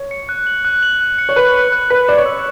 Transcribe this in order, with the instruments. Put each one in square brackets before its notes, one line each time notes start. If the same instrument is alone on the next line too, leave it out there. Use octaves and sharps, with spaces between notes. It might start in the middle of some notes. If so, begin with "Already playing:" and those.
Already playing: [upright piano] C#5
[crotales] C#7
F#6
F#7
F#6
F#7
F#6
C#7
[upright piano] C#5
[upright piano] B4 [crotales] F#6
[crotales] F#7
F#6
[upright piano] B4 [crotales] B6
[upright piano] D5 [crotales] E7
[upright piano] C#5
[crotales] E6